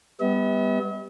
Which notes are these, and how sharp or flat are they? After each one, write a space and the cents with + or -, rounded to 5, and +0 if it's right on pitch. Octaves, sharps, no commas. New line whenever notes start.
G3 +15 B3 +0 E5 -45